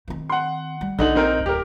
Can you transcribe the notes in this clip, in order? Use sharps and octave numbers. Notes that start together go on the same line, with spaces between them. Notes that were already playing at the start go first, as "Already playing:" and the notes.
D#3 C4
F#5 C6
G3
A#1 D3 D#4 F#7
C4 D#4 A#4
D1 G4 A#4